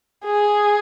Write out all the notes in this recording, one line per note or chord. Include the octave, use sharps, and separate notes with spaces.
G#4